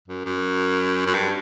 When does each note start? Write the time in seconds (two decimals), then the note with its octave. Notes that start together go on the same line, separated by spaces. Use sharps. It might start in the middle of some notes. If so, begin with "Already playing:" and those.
0.08 F#2
0.25 F#2
1.06 F#2
1.14 G2